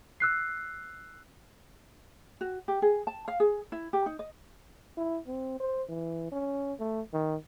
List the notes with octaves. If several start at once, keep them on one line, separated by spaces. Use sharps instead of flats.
E6 F#6 C7
F#4
G4
G#4
A5
F5
G#4
E4
G4
D#4
D#5
E4
C4
C5
E3
C#4
A3
D#3